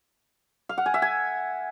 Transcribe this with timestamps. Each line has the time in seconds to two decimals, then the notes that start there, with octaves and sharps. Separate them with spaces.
0.69 F5
0.78 F#5
0.86 G#5
0.94 E5
1.02 G#5